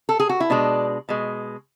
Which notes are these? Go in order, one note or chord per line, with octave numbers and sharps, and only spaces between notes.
A4
G#4
F#4
E4
B2 G#3 D4
B2 G#3